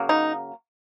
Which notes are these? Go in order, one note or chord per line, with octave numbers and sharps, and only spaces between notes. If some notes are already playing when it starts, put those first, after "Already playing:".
Already playing: C#3 F#3 A#3
D#4